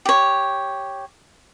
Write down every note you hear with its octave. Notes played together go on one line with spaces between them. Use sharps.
G4 C#5